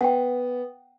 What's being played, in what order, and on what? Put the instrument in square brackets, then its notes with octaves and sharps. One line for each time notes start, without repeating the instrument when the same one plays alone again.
[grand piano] B3 [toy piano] F#5 G5